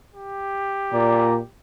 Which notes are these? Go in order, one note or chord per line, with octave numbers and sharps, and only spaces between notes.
G4
A#2 D5 A#5